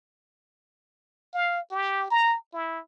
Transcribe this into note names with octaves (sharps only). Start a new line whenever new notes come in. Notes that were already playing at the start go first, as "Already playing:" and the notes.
F5
G4
A#5
E4